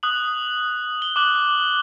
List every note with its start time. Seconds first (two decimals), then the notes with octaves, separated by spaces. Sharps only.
0.03 D#6 F#6 F#7
1.02 G7
1.16 D6 F#6 F#7